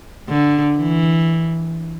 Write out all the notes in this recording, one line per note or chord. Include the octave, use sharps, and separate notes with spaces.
D3
E3